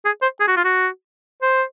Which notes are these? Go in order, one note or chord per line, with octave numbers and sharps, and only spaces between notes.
G#4
C5
G#4
F#4
F4
F#4
C5